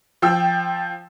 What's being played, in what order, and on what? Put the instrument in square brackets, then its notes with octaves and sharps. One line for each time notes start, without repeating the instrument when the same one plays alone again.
[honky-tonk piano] F3 G5 E6